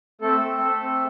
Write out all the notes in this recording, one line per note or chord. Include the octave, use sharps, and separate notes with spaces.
A3 C4 A4
A3
A3
C4